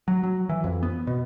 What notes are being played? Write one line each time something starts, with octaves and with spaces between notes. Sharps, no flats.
F#3
F#3
E3
F2
B3
B2